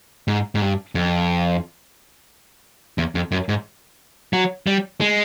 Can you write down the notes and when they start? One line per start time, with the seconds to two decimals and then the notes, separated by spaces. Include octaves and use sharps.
0.28 G#2
0.55 G#2
0.62 G2
0.95 F2
2.98 E2
3.15 F2
3.32 F#2
3.49 G#2
4.33 F#3
4.67 G3
5.01 G#3